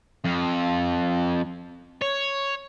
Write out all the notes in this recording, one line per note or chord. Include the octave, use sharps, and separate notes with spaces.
F2
C#5